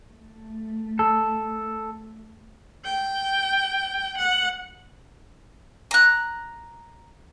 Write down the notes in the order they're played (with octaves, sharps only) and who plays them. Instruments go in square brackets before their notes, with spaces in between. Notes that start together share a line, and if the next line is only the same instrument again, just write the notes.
[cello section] A3
[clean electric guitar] A4
[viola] G5
F#5
[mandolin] A#5 F#6